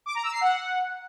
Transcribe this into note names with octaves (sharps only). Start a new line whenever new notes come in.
D6
A#5
E6
C7
F#5